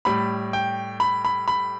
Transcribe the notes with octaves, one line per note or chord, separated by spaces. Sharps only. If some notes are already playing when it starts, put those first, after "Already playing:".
A2 G3 B5
G5
B5
B5
B5